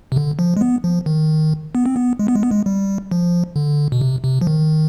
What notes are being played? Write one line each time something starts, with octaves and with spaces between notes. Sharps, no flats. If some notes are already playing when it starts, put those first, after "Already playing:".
C3
D3
F3
G#3
B3
F3
D#3
B3
C4
B3
G#3
B3
G#3
B3
G#3
G3
F3
D3
B2
C3
C3
F3
D#3